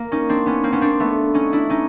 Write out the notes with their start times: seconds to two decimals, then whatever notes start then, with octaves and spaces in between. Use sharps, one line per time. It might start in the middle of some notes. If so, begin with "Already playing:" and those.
Already playing: A#3
0.12 C#4 D#4
0.29 C4 D4
0.46 B3 C#4
0.63 A#3 C4
0.72 B3 C#4
0.81 C4 D4
1.00 A3 B3
1.34 C#4 D#4
1.52 D4 E4
1.70 C#4 D#4